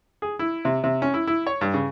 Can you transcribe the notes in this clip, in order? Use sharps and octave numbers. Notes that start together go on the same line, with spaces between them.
G#4
E4
C3
C3
C#4
E4
E4
C#5
G2
C#3